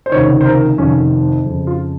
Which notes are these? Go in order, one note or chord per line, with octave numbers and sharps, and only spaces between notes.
C5
C#2 C3 D#3 C#5
C5
A#4
F2 C3 D#3 C#4
F2 C#3
F4